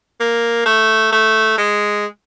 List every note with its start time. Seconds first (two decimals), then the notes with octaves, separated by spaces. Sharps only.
0.20 A#3
0.66 A3
1.12 A3
1.58 G#3